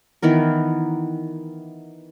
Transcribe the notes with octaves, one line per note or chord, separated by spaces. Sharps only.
D#3 E3 B3 A#4